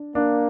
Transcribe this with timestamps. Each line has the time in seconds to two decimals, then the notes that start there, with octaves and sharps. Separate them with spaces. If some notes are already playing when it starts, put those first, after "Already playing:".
Already playing: D4
0.15 A#3 D4